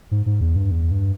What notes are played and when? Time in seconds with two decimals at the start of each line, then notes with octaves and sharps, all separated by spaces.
0.11 G#2
0.26 G#2
0.41 E2
0.56 G2
0.71 E2
0.91 G2